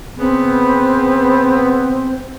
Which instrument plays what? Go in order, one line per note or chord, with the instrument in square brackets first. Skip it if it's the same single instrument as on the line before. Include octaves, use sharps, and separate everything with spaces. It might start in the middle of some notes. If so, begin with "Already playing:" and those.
[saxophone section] C#3 B3 [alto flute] C4